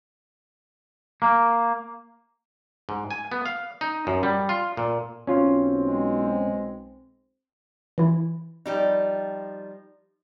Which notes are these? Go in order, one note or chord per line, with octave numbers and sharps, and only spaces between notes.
A#3
G#2
G#5
B3
F5
D#4
F#2
G3
F4
A#2
B1 C4 C#4 F4
G#3
E3 E4
F3 G3 D#4